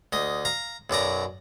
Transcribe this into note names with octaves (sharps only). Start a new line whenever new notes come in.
D2 D#5
F5 A#5
B1 F#2 D5 A#5